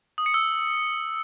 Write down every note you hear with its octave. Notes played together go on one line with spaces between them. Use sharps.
D#6
C#7
E6